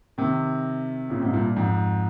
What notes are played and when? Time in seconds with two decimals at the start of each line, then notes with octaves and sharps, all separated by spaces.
0.18 C3 D#3
1.10 A#2 C#3
1.22 G#2 C3
1.34 G2 A#2
1.56 F2 G#2